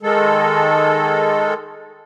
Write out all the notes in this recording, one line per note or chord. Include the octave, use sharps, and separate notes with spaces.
D#3 G#3 A4